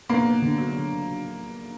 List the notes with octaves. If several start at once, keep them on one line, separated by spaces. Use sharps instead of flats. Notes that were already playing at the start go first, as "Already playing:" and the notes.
A#3 B3
B3
D3
F#3
D3